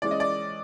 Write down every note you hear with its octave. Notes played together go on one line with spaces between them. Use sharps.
E3 G#3 C#4 D5
D#5
D5